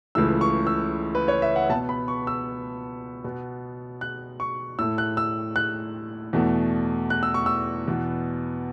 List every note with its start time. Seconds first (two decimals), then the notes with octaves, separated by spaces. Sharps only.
0.15 C#2 C#3 E3 A3 E6
0.41 C#6
0.67 E6
1.15 B4
1.28 C#5
1.42 E5
1.56 F#5
1.69 B2 A5
1.73 B3
1.89 B5
2.08 C#6
2.27 E6
3.24 B2 B3
4.01 F#6
4.40 C#6
4.79 A2 A3 E6
4.98 F#6
5.17 E6
5.56 F#6
6.33 E2 B2 A3
7.10 F#6
7.23 E6
7.34 C#6
7.46 E6
7.88 E2 B2 B3